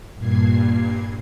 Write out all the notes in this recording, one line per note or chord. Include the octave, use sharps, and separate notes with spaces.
G2 A#2 G#6 C7